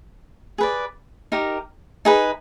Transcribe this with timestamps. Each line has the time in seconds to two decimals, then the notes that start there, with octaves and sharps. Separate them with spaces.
0.58 G#4 B4 D5
1.32 D#4 G4 A#4
2.05 D#4 G#4 B4